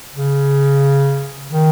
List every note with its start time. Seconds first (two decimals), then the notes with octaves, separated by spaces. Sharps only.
0.14 C#3
1.50 D#3